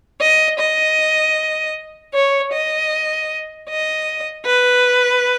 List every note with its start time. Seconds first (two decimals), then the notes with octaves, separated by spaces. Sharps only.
0.20 D#5
0.58 D#5
2.13 C#5
2.51 D#5
3.68 D#5
4.44 B4